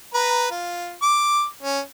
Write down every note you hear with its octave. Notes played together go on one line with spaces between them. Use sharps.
B4 A#5
F4
D6
C#4